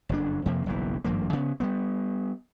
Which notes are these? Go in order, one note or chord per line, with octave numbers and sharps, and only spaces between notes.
F#1 F2 D4
F2 C3 F3 A#3
F#1 B1 G2 E3
G#1 G2 F3 A#3
C#3 B3
G3 A3 B3